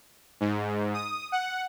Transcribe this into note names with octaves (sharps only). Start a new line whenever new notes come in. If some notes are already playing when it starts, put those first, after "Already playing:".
G#2
D#6
F#5